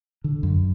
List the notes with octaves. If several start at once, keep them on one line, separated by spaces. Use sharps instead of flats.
D3
F#2